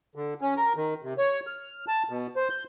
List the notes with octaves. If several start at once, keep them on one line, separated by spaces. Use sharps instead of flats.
D3
C#4
A#4
D#3
C3
C#5
F6
A5
B2
C5
G6